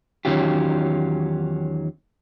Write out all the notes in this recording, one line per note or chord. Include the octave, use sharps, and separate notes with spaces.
E2 D#3 F#3 C#4 F4 G4